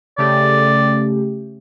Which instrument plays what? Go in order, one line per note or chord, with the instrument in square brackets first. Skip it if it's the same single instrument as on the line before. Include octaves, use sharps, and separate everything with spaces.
[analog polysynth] C#3 A3 G4 [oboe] D5